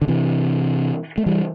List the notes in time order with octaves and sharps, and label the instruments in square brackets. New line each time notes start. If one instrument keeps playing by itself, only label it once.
[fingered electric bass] D3
C3 E3
A3
E3 G3